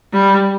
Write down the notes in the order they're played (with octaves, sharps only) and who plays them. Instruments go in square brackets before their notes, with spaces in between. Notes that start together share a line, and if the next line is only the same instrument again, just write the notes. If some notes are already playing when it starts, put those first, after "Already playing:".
[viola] G3